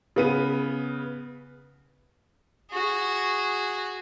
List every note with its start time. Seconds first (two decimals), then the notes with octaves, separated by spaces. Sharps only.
0.16 C#3 B3 D#7
2.71 F#4 G#4